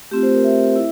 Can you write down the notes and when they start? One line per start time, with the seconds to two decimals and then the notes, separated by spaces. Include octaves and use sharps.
0.11 A3 C4 F4 G4
0.23 C5
0.33 A#4
0.44 E5
0.76 E4